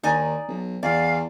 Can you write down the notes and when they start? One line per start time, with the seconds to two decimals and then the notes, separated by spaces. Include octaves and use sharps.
0.03 D#2 D#4 D5 G#5
0.48 B1
0.83 E2 D5 F5